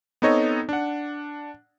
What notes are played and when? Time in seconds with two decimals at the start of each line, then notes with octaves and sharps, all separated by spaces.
0.22 B3 C4 D#4 A4 C#5 D#5
0.69 D4 F#5